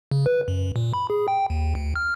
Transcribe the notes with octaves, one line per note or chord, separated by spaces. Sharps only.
C#3
B4
F#2
A#2
B5
G#4
G5
D#2
D2
F6